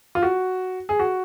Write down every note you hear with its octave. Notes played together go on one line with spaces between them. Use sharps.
F4
F#4
G#4
F#4